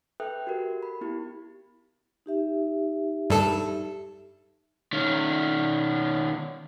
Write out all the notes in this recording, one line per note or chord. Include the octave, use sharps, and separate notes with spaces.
A4 B4 E5 G5 D#6 F#6
F#4 G4 A#4
B5
B3 E4 G4
D#4 G4 E5
G2 A4
D#3 C#4